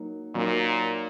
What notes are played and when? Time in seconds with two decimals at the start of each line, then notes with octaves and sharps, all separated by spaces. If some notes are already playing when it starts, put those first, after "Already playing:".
Already playing: F#3 A#3 D#4
0.35 A#2 F#3 A#3 D#4